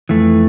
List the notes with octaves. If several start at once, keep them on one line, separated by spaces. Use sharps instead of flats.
F2 E3 A3